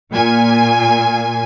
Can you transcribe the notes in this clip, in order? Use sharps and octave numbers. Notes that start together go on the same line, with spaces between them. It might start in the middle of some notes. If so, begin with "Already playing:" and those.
A#2 G#5